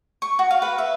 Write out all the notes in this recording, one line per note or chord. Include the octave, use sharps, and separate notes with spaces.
C#6
F#4
F5
B4
E5